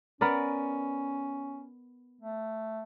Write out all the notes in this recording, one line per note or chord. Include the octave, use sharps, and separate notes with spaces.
B3 C#4 A#4 D5
A3